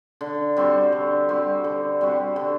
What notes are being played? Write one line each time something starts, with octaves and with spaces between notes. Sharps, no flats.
D3
G3 C4 F#4
D3
G3 C4 F#4
D3
G3 C4 F#4
D3